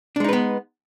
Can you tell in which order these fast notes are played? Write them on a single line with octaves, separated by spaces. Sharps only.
D4 G#3 D#4 B4 B3